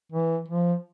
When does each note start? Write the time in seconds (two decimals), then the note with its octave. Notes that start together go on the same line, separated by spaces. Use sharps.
0.12 E3
0.48 F3